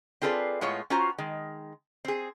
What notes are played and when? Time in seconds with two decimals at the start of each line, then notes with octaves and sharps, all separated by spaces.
0.22 C4 F4 G#4 A4 B4 D5
0.61 A2 G#3 B3 F4 C#5
0.90 C#4 F4 F#4 C5 A#5
1.18 D#3 G#3
2.05 C4 G#4